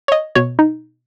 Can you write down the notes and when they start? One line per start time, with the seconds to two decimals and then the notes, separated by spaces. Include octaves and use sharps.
0.08 C#5
0.12 D#5
0.35 B2 C#5
0.59 D#4